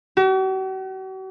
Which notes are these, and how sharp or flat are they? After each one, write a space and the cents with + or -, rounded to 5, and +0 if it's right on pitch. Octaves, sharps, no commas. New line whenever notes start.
F#4 +45